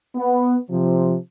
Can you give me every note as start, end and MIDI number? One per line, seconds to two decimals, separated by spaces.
0.15 0.58 59
0.71 1.16 48
0.71 1.16 53